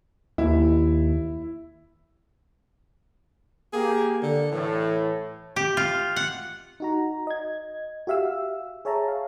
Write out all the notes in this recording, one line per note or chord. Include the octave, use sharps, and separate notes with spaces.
D#2 E4
A#3 G4 G#4
D3
A2 E3
G4
F4
F#5
D#4 F#4 A#5
D#5 G#6
F#4 G4 E5 F5 E6
G#4 C#5 E5 A5 A#5
F5